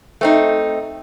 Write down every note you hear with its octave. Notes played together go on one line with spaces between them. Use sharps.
A3 C4 D#4